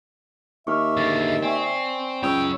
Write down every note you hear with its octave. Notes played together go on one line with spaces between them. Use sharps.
D#2 E5 C#6 D6 F6
D3 G#3 A6 B6
C4 D5 G#5 C#6
C#2 F#2 C#5 G5 B5 D#6 E6